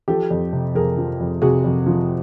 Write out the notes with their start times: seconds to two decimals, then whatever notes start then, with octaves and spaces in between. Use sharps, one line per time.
0.08 F3 G4 A4
0.31 F2
0.53 C3
0.75 F2 G#4 A#4
0.97 F3
1.20 F2
1.42 C3 F#4 G#4
1.64 F2
1.86 F3